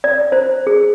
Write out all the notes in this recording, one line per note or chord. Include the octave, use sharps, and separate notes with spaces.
D5
C5
G#4